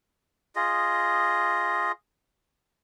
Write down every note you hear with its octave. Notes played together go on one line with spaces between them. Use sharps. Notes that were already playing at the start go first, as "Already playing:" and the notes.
F4 G#4 D#5